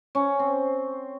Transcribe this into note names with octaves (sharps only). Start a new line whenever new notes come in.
C#4
C4